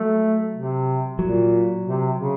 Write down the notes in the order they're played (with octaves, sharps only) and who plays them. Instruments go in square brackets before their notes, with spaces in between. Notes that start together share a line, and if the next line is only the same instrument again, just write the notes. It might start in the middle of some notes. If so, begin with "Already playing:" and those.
Already playing: [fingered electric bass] F#3 [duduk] A3
[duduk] C3
[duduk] A#2 [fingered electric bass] F#3
[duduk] C3
C#3